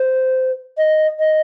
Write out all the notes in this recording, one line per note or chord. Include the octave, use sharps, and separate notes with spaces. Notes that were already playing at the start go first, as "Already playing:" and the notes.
Already playing: C5
D#5
D#5